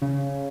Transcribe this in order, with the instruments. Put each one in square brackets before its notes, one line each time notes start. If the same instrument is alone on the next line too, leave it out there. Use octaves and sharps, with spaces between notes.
[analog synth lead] C#3